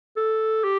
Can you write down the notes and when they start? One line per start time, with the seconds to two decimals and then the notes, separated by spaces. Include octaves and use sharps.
0.16 A4
0.64 G4